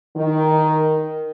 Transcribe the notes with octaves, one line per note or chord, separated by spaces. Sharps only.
D#3